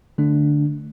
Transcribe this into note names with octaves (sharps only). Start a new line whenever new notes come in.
D3 A3 D4